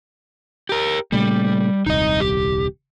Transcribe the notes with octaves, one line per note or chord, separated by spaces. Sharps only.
G4 A#4
A#2 C#3 G3 A3
D#1 C2 D#4 D#5
G4